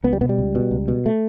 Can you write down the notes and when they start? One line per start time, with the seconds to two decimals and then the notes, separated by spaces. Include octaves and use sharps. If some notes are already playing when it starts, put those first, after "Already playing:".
0.04 C#2 B3
0.13 G3
0.21 B2 B3
0.29 G3
0.38 C#2
0.55 B2
0.71 C#2
0.88 B2
1.06 A3